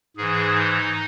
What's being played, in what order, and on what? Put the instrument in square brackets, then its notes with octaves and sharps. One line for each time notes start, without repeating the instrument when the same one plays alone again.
[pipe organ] G#2 E3 G#4
D#4